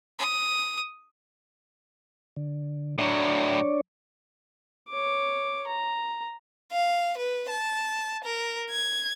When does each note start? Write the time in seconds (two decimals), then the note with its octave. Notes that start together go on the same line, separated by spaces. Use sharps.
0.19 D#6
2.36 D3
2.98 A2 F#3 D4 C#5 D5
4.89 C#5 D6
5.67 A#5
6.72 F5
7.18 B4
7.50 A5
8.24 A#4
8.70 G#6